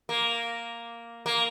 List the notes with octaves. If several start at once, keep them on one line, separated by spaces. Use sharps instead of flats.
A#3
A#3